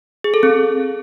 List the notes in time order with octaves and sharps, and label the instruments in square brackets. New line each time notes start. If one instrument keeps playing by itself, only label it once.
[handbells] G#4
A4
C4